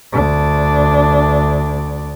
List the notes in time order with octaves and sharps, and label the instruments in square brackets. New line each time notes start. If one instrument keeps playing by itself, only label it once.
[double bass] D2 D4